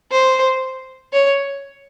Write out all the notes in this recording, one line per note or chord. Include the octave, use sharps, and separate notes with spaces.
C5
C#5